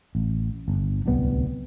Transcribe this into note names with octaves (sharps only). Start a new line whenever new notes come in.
A1
G1
D1 C2 G3 B3